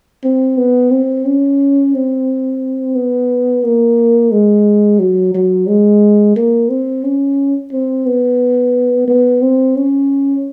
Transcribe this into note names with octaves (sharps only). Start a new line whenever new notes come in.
C4
B3
C4
C#4
C4
B3
A#3
G#3
F#3
F#3
G#3
A#3
C4
C#4
C4
B3
B3
C4
C#4